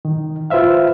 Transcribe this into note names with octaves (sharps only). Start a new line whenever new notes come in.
D#3
F4 B4 C5 E5 F5